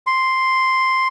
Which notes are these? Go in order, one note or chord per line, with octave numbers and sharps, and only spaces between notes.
C6